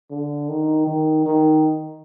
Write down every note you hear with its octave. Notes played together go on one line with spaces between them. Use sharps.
D3
D#3
D#3
D#3